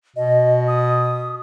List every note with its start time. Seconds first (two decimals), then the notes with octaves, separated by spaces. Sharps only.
0.16 B2 D#5
0.68 D#6